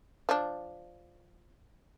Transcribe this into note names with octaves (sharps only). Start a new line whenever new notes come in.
F3 D4